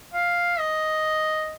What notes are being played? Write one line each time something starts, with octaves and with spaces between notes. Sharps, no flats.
F5
D#5